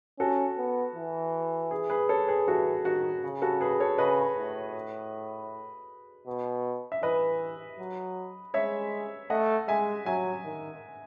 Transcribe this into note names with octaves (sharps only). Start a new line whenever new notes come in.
C#4 F#4 A4
B3
E3
G#4
G#4 B4
A4 C#5
G#4 B4
E3 F#4 A4
D#3 F#4
C#3
F#4 A4
G#4 B4
A4 C#5
C#3 B4 D#5
A2
B2
E5
E3 B4 D#5
F#3
G#3 C#5 E5
A3 D#5 F#5
G#3 E5 G#5
F#3 E5 G#5
D#3